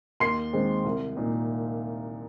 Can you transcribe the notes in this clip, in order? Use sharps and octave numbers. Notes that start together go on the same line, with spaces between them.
D#2 C6 C7
D#3 G#3 C4
C2
A#2 A#3 D#4